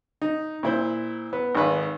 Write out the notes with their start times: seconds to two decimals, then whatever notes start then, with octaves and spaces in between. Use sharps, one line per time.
0.22 D#4
0.63 A#2 E4 C5
1.33 B3
1.55 G#1 D#3 B4 F5